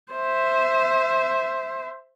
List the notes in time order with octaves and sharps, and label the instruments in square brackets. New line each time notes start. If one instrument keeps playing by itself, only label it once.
[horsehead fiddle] C5 E5